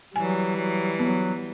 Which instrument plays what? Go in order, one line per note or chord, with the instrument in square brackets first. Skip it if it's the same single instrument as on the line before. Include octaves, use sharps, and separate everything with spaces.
[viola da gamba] E3 G3 [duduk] F#3 [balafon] G#5
[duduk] F#3
[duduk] F#3 [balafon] B3